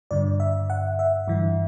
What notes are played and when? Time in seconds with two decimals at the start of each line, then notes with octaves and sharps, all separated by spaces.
0.11 G2 D3 D5
0.40 E5
0.70 F#5
0.99 E5
1.28 G2 E3